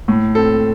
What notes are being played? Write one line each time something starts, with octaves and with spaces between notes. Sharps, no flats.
A2
C4 A4